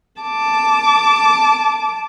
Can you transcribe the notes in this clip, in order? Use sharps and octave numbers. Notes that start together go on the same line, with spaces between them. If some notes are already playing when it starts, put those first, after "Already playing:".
A5 D6